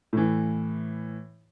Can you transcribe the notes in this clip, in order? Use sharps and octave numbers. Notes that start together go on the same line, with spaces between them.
A2 E3